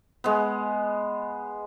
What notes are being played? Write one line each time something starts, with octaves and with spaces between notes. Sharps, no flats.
G#3 B3